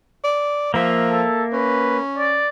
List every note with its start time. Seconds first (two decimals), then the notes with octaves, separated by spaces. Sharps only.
0.24 D5
0.74 F3 A#3 E5
1.10 A4
1.53 C#4 B4
2.18 D5